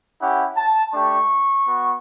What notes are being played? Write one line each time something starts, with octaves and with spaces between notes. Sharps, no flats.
C#4 E4 G4 F#5
A5
A3 D4 G4 C#6
B3 F#4